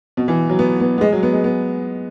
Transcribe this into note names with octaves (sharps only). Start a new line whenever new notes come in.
B2
E3
F#3
B3
B3
B3
G#3
F#3
B3
G#3
B3